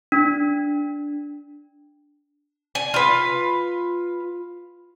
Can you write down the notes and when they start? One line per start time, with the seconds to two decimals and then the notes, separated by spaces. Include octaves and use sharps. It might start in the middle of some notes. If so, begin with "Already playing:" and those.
0.12 D4
2.75 G#5
2.94 F4 B4